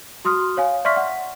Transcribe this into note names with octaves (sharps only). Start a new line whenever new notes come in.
F#4 C6 D#6 F6
C#5 F5 G#5
D5 E5 C6 C#6 F6 B6
F#5